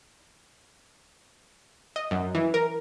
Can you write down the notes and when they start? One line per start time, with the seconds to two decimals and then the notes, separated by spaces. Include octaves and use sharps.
1.96 D#5
2.11 F#2
2.35 E3
2.54 A#4